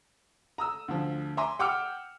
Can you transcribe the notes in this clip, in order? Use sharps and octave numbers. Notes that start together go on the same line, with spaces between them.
A#5 D#6 E6
D2 F3
E5 G#5 A#5 C6 D6
F#5 G5 D6 E6 F6 C#7